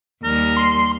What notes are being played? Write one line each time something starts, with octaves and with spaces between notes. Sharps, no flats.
D#2 G3 A#4
C6